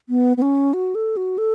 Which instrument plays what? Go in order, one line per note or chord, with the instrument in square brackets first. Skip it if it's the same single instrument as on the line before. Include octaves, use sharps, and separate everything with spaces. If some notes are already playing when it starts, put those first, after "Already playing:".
[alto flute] B3
B3
C#4
F#4
A4
F#4
A4